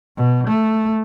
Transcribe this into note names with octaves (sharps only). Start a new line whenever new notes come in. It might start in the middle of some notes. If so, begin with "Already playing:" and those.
B2
A3